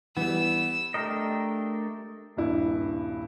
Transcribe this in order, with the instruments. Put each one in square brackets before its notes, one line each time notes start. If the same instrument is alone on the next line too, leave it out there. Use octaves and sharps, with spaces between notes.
[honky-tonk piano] E3 G3 [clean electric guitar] B3 [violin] E6
[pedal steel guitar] A3 D4 G4 A#4 D#5
[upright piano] D#1 G2 E4